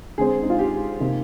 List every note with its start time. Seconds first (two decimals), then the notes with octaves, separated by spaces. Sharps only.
0.18 D3 G#3 C4 G#4
0.42 D#4
0.50 F4
0.59 G4
1.00 C3 D#3 A#3